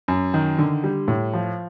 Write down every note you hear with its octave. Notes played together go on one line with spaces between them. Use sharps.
F#2
D#3
D3
G3
A2
F3